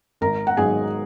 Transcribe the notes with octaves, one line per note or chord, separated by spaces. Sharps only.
G#1 A#4 A#5
F#5
G#2 F#3 G#4 G#5